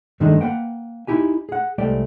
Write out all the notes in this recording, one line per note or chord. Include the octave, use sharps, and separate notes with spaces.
G2 D#3 G#3 A3 D4 D#4
A#3 B4 F#5 G5
D#4 E4 G4 G#5
G#4 F#5
C2 G#3 A3 G4 D5 G5